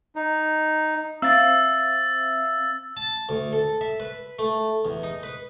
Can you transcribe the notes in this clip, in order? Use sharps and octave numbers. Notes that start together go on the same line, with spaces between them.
D#4
C4 E5 F5 E6 A6
A5
D2
A4
E5
B4
A3
E2
D#4
B4